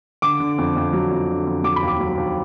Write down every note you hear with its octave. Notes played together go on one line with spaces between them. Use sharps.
D3 D6
D3
F2
F2
F#3
F2
D3
F2
F#3 D6
B5
D#2
D6
F#3
D#2